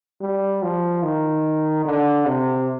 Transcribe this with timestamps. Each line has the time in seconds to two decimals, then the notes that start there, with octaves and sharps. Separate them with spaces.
0.21 G3
0.63 F3
1.03 D#3
1.85 D3
2.26 C3